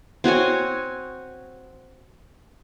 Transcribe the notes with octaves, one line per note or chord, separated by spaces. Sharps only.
C4 F#4 C#5 G#5